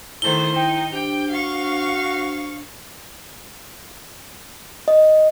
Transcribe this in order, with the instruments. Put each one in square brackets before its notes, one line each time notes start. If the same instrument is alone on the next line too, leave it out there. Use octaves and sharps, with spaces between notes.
[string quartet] D#3 A3 C5 [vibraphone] E4 [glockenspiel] G7
[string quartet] D#4 [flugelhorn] G5
[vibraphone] D4 C5 [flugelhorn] G4 [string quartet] G5
[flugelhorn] F#4 [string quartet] F5 C#6
[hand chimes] D#5